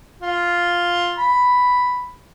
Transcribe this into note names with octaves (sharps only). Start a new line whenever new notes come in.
F4
B5